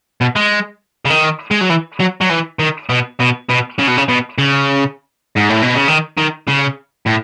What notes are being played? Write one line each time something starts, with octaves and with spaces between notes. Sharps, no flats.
B2
G#3
C#3
D#3
G#3
F#3
E3
F#3
F#3
E3
D#3
B2
B2
B2
C#3
B2
C#3
B2
C#3
G#2
A2
B2
C#3
D#3
D#3
C#3
A2